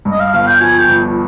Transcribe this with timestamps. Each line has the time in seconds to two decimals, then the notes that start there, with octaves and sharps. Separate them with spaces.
0.05 G2
0.11 D#5
0.20 F5
0.33 G1 F5
0.47 G5
0.60 F3 G#5
0.79 G5
0.88 G1